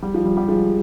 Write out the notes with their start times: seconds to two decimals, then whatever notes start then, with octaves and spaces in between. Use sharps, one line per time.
0.02 G3
0.14 F3
0.25 G3
0.37 G3
0.49 F3 G#3